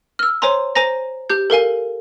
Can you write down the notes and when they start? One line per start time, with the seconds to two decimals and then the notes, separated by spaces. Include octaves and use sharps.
0.19 E6 F6
0.42 C5 C#5 G#5 A#5 C6
0.75 C5 G#5 A#5 A#6
1.30 G4 G6
1.50 A4 A#4 F5 G#5